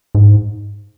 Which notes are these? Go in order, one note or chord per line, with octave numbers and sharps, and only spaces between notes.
G#2